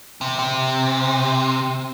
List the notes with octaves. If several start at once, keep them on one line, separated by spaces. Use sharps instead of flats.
C3
C3